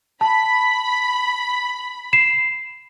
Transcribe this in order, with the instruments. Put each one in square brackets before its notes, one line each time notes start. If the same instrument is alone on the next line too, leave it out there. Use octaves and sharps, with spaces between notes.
[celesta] A5 [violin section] B5
[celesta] C7 E7